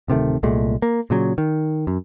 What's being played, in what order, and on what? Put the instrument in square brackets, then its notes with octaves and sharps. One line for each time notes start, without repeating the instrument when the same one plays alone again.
[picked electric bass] D1 C3 D#3 A3
C2 A#2 G#3 A3
A#3
A#2 C#3 F#3
D#3
F#2